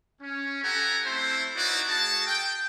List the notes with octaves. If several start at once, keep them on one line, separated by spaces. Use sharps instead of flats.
C#4
F4 G4 A4 F#5 G#5 A#5
A3 C4 E4 C5
D#4 E4 F#4 B4 C#5 D5
A3 F#4 G#4 A5
G5